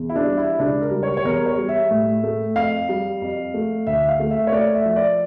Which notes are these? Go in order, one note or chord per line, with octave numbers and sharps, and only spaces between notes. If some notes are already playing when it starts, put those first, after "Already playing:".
Already playing: E2 E3
E4
D4
G3
E4
C#2 D4
A#4
G3
C#5
C#5
E2 A#4
C#5
G3
E5
A2
A3
F2 F5
G3
F2
A3
D2 E5
F5
A3
E5
C#5
A3 D5
E5
F3 E5
D5